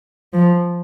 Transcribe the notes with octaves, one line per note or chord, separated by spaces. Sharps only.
F3